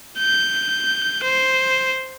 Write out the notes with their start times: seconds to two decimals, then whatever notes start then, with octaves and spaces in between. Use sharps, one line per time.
0.19 G6
1.24 C5